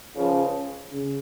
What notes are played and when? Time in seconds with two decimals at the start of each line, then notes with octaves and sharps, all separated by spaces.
0.15 C#2 C#3 F3
0.91 C#3